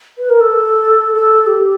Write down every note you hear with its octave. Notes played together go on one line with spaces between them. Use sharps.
B4
A#4
A4
A4
G4